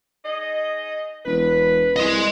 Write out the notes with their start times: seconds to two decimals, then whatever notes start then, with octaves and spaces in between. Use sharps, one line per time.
0.23 D#4 G#4 D#5
1.26 E1 B4
1.96 C2 D#5 C6